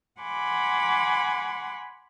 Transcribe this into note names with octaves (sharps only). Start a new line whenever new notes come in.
F#5 G#5 B5 C6 D6